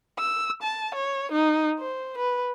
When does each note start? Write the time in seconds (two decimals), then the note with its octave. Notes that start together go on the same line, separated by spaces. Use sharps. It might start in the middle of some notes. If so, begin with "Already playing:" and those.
0.19 E6
0.63 A5
0.95 C#5
1.32 D#4
1.79 C5
2.18 B4